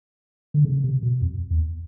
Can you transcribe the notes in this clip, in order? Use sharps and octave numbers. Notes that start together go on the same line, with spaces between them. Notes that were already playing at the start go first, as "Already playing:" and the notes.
D3
C#3
C3
B2
F2
E2